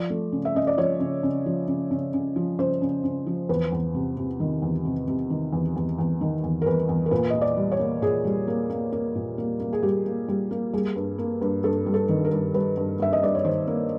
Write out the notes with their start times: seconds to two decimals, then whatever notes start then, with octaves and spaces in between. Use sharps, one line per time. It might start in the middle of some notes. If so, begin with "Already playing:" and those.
Already playing: F3 D5
0.10 A3
0.32 C#3
0.45 E5
0.55 C#3 D#5
0.67 D5
0.77 F3 C#5
1.00 C#3
1.23 C#3
1.46 F3
1.68 C#3
1.91 C#3
2.14 C#3
2.36 F3
2.59 C#3 C5
2.82 C#3
3.04 C#3
3.27 F3
3.49 E2 B4
3.72 E2
3.94 C3
4.17 C3
4.40 D#3
4.62 E2
4.85 C3
5.08 C3
5.30 D#3
5.53 E2
5.76 E2
5.98 E2
6.21 D#3
6.44 E2
6.62 A#4
6.66 E2 B4
6.89 E2
7.06 A#4
7.11 A#2 B4
7.30 A#2 D#5
7.41 D5
7.57 G3
7.72 C#5
7.79 A#3
8.02 A#2 G#4
8.24 G3
8.48 A#3
8.70 A#3
8.92 A#3
9.15 A#2
9.38 A#3
9.60 A#3
9.73 G#4
9.83 G3 G4
10.05 A#3
10.28 G3
10.51 A#3
10.73 G3 G#4
10.96 G2
11.18 A#3
11.41 G2
11.64 G2 A4
11.86 G3
11.94 A4
12.09 D#3
12.25 A#4
12.32 G2
12.54 G3 B4
12.77 G2
13.00 G2 E5
13.13 D#5
13.23 G2 D5
13.35 C#5
13.44 D#3 C5
13.67 A#3